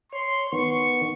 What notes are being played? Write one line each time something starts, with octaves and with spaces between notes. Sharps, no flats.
C#5 C6
D#3 B3 C#6